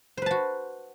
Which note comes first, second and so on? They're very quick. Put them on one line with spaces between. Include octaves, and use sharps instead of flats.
C5 B4 A5 F#4